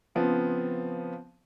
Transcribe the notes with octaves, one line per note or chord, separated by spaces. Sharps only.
C#3 F3 B3 C4